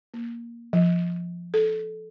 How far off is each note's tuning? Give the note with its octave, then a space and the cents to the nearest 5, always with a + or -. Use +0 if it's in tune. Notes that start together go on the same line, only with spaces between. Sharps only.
A#3 +10
F3 -5
A4 -15